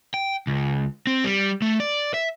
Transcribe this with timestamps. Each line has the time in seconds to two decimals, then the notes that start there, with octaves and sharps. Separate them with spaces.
0.14 G5
0.47 C#2
1.07 C4
1.24 G3
1.62 A3
1.80 D5
2.14 E5